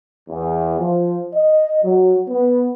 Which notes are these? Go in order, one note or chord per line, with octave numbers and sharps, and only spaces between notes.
E2
F3
D#5
F#3
B3